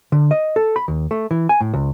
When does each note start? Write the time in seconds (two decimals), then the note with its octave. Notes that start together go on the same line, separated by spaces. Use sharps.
0.12 D3
0.31 D#5
0.56 A4
0.76 B5
0.88 D#2
1.11 A3
1.31 E3
1.49 G#5
1.61 A2
1.74 C#2